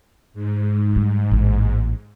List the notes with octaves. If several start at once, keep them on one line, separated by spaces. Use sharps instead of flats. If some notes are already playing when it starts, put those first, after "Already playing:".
G#2
G3
A1 A#3